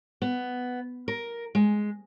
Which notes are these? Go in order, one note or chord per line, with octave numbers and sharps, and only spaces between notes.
B3
A#4
G#3